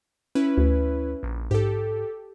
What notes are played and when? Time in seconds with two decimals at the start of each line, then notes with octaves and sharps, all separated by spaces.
0.35 C#4 E4 B4
0.58 D2
1.23 A#1
1.51 G#2 G4 A4